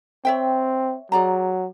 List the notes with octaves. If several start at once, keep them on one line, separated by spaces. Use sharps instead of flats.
C4 C#5 E5 G5
F#3 G#4 D5 A#5